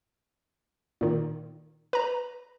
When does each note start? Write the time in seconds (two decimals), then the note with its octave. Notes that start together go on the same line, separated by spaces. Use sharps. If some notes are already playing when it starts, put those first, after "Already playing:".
1.01 A#2 D#3
1.93 B4 A#5